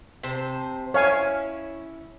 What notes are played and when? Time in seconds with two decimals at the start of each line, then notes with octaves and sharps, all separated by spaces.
0.23 C3 C5 A5
0.94 C#4 E4 C#5 F5 G#5